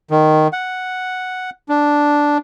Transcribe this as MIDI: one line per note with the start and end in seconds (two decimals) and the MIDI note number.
0.11 0.48 51
0.53 1.50 78
1.69 2.38 62